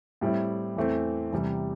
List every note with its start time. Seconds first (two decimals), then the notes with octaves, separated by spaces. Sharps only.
0.21 A2 G3 C4 E4
0.76 E2 E3 A3 C4
1.32 E2 C3 G3